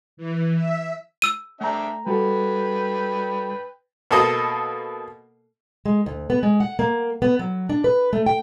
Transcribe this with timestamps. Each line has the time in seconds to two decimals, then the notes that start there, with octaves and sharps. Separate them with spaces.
0.17 E3
0.55 E5
1.22 E6 D#7
1.61 A3 D4 E5 G5 A#5
2.06 G3 F#4 A4 B4 G5
4.11 B2 A#3 A4 D#5
5.85 G#3
6.06 D2
6.30 B3
6.43 G#3
6.60 F#5
6.79 A#3
7.22 B3
7.39 F#3
7.69 D4
7.84 B4
8.13 A3
8.26 G5